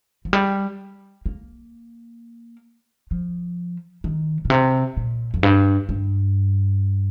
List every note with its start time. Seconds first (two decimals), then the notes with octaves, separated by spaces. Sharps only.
0.25 F3
0.33 G3
1.26 A#3
3.11 F3
4.04 D#3
4.45 A#2
4.50 C3
4.97 A#2
5.34 F2
5.43 G2
5.89 G2